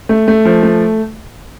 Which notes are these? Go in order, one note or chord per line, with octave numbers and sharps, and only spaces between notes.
A3
A3
F3
A3